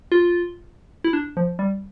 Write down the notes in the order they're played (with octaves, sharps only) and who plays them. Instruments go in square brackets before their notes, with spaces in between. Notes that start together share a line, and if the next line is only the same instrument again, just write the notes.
[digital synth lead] F4
E4
D4
F3
G3